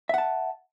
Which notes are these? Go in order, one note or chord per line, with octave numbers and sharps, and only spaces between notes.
E5 F#5 A5